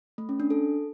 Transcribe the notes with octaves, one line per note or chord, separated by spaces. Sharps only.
A3
C#4
D4
A4